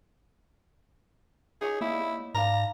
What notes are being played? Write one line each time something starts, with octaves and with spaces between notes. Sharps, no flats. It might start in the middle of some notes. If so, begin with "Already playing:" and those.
D#4 G#4 C#5 D#5
A#3 E4
G#2 D5 F5 A#5